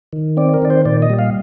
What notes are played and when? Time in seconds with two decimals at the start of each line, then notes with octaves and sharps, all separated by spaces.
0.13 D#3
0.37 C4 D5
0.54 A#4
0.62 D#3 D5
0.70 C5
0.85 A#2 D5
1.02 D#5
1.10 G3
1.19 F5